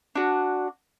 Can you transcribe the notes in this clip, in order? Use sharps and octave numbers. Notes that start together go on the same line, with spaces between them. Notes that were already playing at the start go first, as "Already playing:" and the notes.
D4 F#4